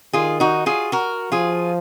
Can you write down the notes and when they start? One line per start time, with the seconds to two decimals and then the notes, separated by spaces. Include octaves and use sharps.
0.13 D#3 F4 G#4
0.40 D#4 F#4
0.66 F4 G#4
0.92 F#4 A#4
1.32 F3 F4 G#4